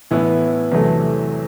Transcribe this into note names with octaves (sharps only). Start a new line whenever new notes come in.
A2 E3 B3 E4
E2 C3 F#3 A3